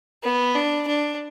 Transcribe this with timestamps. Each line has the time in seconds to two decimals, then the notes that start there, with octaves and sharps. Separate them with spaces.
0.23 B3
0.55 D4
0.88 D4